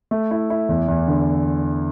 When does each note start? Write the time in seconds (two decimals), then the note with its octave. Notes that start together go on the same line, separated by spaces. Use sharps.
0.11 A3
0.31 E4
0.50 E4
0.69 E2
0.88 E2
1.08 D3